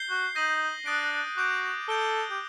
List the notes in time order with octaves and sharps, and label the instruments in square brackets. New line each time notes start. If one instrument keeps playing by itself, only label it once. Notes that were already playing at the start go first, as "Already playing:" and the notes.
Already playing: [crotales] G6 C7 G7
[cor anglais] F#4
[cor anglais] D#4 [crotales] G6 A#6 D#7 F#7
[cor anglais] D4 [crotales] D#6 F#6 A6 D7
[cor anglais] F#4 [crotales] D6 G6 D7
[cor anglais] A4 [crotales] D#6 G6 D7 G7
[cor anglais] G4